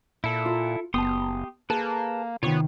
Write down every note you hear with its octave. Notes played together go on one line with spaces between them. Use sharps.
A#2 E4 A4
F4
F#1 B3 G4 A5 C6 D#6
A#3 G#4 A4 B4 A5
C3 D#3 B3 F4 C#5 C#6